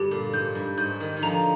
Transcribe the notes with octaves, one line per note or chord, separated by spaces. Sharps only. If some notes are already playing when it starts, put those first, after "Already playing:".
Already playing: G2 D3 G4
A#2
G#2 G6
G2
G#2 G6
D#3
D#3
D3 F3 A#5